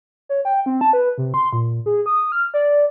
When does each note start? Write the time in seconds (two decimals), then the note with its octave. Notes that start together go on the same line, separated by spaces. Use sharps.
0.29 C#5
0.45 G5
0.66 C4
0.81 A5
0.93 B4
1.18 C3
1.34 C6
1.53 A#2
1.86 G#4
2.06 D#6
2.32 F6
2.54 D5